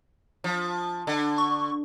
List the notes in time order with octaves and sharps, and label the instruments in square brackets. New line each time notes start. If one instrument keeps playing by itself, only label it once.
[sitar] F3
D3
[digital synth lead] C#6